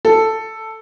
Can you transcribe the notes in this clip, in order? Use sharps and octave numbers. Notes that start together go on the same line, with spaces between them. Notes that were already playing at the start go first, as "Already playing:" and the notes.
A4